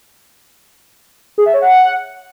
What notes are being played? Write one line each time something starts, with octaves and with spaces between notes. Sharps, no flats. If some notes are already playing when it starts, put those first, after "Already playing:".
G#4
E5
C#5
F#5